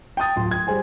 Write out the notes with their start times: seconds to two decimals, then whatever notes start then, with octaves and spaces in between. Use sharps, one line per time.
0.17 G5 A5 D#6 A6
0.36 D1 F4 C6
0.51 G#6
0.67 G3 G#4 C5 G#5 C6